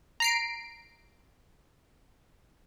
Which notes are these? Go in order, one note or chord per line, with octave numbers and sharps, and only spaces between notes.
A#5 C7 D7